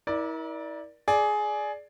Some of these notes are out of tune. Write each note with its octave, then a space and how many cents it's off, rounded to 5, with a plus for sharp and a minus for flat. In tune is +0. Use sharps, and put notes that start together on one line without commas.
E4 -35 A#4 +35 D5 +0
G#4 +15 D5 +0